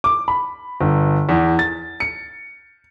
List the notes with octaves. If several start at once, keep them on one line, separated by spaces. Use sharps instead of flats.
D6
B5
G1
E2
A6
C#7